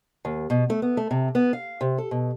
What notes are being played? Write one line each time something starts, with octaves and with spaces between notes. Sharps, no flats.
D#2
B2
A3
B3
A3
C3
B3
F5
C3
A4
B2